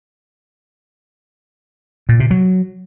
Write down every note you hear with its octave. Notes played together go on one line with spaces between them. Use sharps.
A#2
C3
F#3